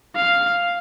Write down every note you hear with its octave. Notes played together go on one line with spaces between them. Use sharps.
F5